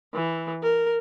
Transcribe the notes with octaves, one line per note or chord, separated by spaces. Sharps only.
E3
A#4